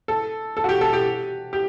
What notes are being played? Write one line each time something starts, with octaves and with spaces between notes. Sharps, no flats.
A4
A4
F#4
G4
A4
G4
G4